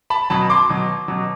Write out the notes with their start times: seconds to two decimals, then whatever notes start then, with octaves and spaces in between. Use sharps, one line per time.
0.10 A5 B5
0.30 B2 F#3 A5 B5
0.50 C6 D6
0.69 B2 F#3
1.08 B2 F#3